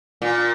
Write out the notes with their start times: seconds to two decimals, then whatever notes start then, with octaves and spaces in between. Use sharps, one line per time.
0.22 A#2